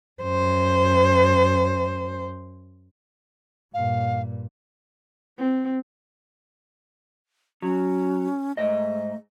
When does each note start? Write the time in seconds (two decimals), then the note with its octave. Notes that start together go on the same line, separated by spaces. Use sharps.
0.23 F#2 C5
3.74 G2 A#2 F5
5.38 C4
7.62 F#3 C#4
8.57 G#2 A3 D#5